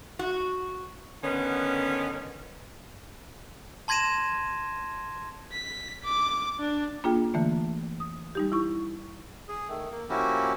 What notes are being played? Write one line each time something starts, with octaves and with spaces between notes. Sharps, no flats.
F#4
D3 D#3 B3 C#4
A5 C6 G#6 A#6 D#7 E7
B6
D6
D4
A#3 D4 F4 G#4 G5
D3 E3 A3 A#3
D#6
G3 D#4 G4
E4 C#6
G#4
D#3 A3
A#3
F3 A#3 C#4 E4 F#4 G4